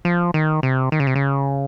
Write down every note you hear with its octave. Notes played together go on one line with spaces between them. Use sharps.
F3
D#3
C3
D#3
C#3
C3
C#3